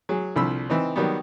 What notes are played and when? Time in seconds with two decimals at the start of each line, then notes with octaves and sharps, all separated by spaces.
0.09 F#3 G#4
0.36 C2 D3 F3 B5 E6
0.70 E3 C4 D#4
0.96 D#3 F#3 G3 B3